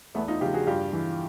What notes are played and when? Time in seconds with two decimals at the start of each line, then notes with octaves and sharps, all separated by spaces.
0.15 E2 A3 B3
0.28 D#4 F4
0.41 C#3 F4 G4
0.44 F3
0.54 F#4 G#4
0.67 G2 F4 G4
0.93 E3